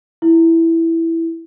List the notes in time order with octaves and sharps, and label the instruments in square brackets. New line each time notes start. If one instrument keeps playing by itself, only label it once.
[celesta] E4